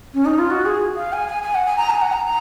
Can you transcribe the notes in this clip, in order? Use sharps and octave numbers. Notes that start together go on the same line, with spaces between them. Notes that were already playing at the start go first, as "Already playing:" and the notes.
C#4
D#4
F4
F#4
G#4
F5
G#5
G#5
G#5
F#5
G#5
A#5
G#5
F#5
A#5
A#5